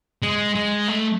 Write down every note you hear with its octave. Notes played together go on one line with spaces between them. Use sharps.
G#3
G#3
A3